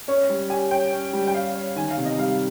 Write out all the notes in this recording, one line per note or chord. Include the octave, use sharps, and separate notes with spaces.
C#4 C#5
G3
G4 G#5
C#5 G5
C#4
G3
G5
G4 F5
C#5
D#3 G#5
F5
C3
D#5
G3 F5